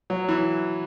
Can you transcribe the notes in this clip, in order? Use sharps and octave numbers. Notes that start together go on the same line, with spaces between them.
F#3
E3